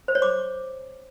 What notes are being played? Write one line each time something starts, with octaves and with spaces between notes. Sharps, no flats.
C5
C#5
D6